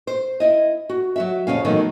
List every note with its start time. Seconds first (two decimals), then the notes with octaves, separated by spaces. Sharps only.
0.07 C5
0.40 E4 D#5
0.89 F#4
1.16 F#3 F#4 E5
1.47 F2 C#3 C#4 F5
1.65 B2 D#3 E3 F#3 A3 D#4